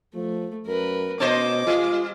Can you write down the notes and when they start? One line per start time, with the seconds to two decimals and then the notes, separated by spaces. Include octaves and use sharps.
0.15 F3 A3
0.67 F#2 A#4 B4
1.20 B2 C#4 C5 D#5 D6
1.67 G3 F4